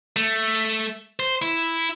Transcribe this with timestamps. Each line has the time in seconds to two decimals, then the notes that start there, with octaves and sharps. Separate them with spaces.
0.16 A3
1.19 C5
1.42 E4